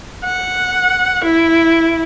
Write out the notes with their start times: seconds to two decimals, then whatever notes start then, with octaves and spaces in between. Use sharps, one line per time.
0.25 F#5
1.24 E4